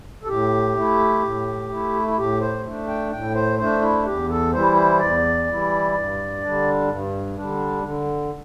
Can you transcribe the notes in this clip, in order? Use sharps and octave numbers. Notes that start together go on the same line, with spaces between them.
A4
A2 G4
A3 E4
A2
A3 E4
E4
A2 G4
C5
A3 D4
G5
A2 G5
C5
A3 D4 C5
E4
E2 G4
A4
E3 G3 E4 C5
C5
E2 D5
E3 G3 E4
G2
D3 G3 D4
G2
D3 G3 D4
D3